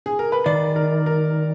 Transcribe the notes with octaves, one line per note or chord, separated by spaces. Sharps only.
G#4
A#4
B4
D#3 D5
A#4
A#4